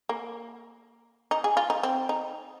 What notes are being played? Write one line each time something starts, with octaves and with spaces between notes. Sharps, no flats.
A#3
D#4
G#4
F4
D#4
C4
D#4